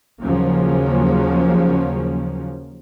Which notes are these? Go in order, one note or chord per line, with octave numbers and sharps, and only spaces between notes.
D#2 C#3 F3 F#3 A#3 C#4